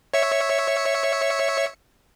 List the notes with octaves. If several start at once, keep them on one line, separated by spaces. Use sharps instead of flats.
C#5 E5 C#7